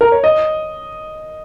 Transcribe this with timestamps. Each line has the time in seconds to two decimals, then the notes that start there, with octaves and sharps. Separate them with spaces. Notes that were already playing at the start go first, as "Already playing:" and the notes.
0.01 A#4
0.12 C#5
0.24 D#5